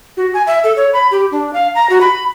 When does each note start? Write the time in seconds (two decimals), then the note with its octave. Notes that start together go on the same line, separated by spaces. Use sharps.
0.17 F#4
0.34 G#5
0.47 E5
0.64 A4
0.77 C#5
0.94 B5
1.11 G4
1.32 D4
1.53 F5
1.75 A#5
1.90 F#4
2.01 B5